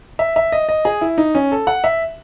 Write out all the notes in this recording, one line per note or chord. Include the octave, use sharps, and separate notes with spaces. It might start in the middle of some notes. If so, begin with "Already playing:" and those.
E5
E5
D#5
D#5
G#4
E4
D#4
C#4
A4
F#5
E5